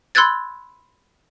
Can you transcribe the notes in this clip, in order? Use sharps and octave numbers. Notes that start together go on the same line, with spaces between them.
B5 C6 E6 F#6 G#6 A6